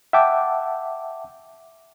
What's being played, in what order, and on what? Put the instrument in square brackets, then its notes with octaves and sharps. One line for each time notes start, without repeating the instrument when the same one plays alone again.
[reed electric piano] E5 F#5 G5 A5 D6